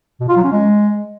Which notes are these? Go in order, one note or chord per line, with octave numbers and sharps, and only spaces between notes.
B2
F4
F#3
C#4
G#3